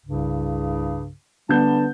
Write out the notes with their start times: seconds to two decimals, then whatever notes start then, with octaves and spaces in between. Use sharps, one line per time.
0.05 C2 G2 C#3
1.49 D3 G3 B3 A5 G6